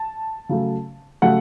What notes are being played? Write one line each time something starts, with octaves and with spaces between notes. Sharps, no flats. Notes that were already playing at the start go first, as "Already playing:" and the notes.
Already playing: A5
C#3 F#3 A3
C#3 F#3 A3 F#5